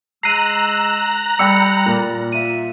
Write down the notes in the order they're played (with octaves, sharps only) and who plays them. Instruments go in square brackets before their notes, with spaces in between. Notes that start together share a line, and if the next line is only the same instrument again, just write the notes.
[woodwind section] G#3 E6 [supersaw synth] A#5 F#6 [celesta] C7 D#7
[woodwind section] G3 [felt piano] G5 B5 E6 [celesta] C#7
[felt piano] A#2
[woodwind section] F4 E5 [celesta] D#7